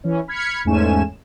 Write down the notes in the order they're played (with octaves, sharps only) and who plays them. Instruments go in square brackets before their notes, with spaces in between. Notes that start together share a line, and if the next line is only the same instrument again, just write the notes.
[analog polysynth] E3 C#4
B5 F6 G#6 B6 C#7
E2 G#2 A3 C#4 G#5 E7